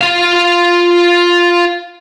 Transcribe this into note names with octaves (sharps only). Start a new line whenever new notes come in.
F4 F5